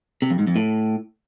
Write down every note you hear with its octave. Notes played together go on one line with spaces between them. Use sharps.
C3
F2
G#2
F2
A2